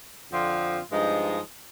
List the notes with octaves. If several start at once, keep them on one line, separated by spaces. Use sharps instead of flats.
F2 D3 F3 C4 F4
G2 F3 G#3 D#4